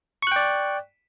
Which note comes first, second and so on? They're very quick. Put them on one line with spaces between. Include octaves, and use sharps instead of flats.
C#6 F#6 G5 D5